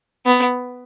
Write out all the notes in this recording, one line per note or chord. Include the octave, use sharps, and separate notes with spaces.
B3